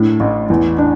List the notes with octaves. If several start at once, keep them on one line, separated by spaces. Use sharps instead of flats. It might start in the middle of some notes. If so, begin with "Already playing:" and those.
Already playing: A2 D4
A1
E2
D4